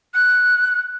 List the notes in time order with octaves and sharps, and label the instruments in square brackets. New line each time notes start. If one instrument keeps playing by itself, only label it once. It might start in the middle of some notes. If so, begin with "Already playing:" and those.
[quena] F#6